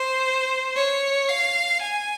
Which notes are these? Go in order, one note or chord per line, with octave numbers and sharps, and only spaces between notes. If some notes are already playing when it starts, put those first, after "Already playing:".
Already playing: C5
C#5
F5
G#5